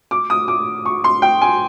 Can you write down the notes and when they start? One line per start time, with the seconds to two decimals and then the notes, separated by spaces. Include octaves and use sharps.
0.11 D6
0.30 D#6
0.48 D6
0.86 C#6
1.04 C6
1.22 G5
1.41 G#5